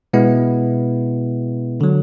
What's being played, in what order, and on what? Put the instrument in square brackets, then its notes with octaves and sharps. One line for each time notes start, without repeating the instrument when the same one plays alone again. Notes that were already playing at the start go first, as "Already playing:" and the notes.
[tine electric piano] B2 G#3 B3 E4
D3 F#3